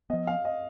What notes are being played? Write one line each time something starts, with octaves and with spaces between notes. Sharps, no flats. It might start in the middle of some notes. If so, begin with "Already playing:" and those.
F3 B3 D#5
F5
D#5